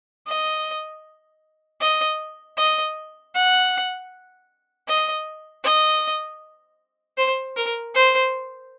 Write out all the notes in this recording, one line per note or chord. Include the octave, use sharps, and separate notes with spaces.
D#5
D#5
D#5
F#5
D#5
D#5
C5
A#4
C5